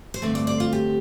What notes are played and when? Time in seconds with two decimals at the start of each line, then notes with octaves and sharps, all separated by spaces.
0.14 C5
0.22 G2 D3 A3 C4 D5
0.35 D5
0.47 D5
0.60 F4
0.73 G4